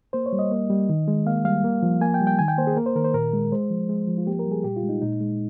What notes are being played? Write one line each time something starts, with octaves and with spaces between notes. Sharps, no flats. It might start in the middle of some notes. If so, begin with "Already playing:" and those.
A#3 C5
C#5
G3
D#5
A#3
G3
D#3
G#3
A#3 F5
G3 F5
A#3
F3
A#3 G#5
G5
G3
G5
D#3 G#5
G5
A#3 C5
G#4
A#3 A#4
C5
D#3 A#4
C5
A#2 A#4
G#3
G#3 C5
F3
G#3
F3
F4
A#3 G4
A#4
G3
G#4
A#2 G4
F4
G#3
D#4
A#2 D#4
G#3